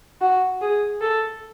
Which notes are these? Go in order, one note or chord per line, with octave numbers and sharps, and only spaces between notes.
F#4
G#4
A4